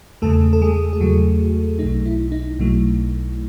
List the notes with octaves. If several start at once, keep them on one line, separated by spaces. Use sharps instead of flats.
E2 C#3 G#3 A3 A4
A4
G#3 G#4
G#4
E2 C#3 F#3 G#3 F#4
B1 B2 F#3 A3 D#4
E4
D#4
B1 B2 F#3 A3